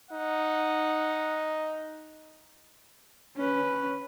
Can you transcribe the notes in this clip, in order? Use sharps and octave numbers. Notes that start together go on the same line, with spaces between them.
D#4 F#5
C#4 B4